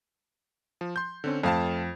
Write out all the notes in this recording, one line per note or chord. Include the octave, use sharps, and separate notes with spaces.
F3
C6 G6
D3 C4 C#4
F2 A3 F5 A5